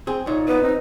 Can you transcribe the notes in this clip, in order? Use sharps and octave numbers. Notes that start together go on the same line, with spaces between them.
C4 G#4
A#2 D#4 C#5
B3 B4
C4 D#4